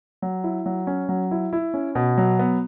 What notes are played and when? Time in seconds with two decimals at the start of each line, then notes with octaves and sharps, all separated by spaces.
0.22 F#3
0.44 E4
0.66 F#3
0.87 C#4
1.09 F#3
1.31 E4
1.53 E4
1.74 C#4
1.95 B2
2.18 F#3
2.39 B3